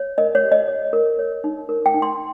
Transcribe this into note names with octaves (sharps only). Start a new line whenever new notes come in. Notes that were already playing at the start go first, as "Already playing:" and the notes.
Already playing: C#5
A#4 D#5
C#5
G4
D#5
C#5
A#4
C#5
D#4
A#4
G5
D#4
C6